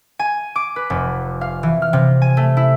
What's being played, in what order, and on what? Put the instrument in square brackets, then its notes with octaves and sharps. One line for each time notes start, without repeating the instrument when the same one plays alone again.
[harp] G#5
D6
B4
F1
F5
E3
F6
C3
G#5
A3
E4